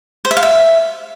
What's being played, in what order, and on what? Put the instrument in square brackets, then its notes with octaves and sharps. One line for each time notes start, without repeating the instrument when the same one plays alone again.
[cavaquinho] C5
E5
F5
E5